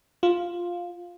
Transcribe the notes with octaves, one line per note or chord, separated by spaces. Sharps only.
F4